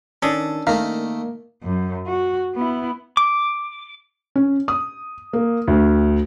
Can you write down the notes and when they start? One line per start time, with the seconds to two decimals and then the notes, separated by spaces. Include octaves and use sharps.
0.22 D#3 C#4 D4 A4 D#6
0.67 D#3 A3 A#3 F5 A#5 B6
1.63 F#2
2.07 F#4
2.56 B3 E4
3.17 D6
4.36 C#4
4.68 D#6
5.33 A#3
5.67 D2